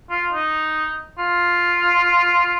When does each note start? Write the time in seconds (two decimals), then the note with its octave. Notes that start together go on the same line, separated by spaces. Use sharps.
0.10 F4
0.32 D#4
1.18 F4